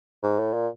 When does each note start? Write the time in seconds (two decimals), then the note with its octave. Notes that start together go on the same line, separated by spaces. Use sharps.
0.23 G#2
0.39 A2
0.54 A#2